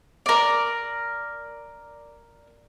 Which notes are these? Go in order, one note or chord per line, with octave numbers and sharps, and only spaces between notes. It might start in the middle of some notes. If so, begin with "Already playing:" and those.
A#4 D5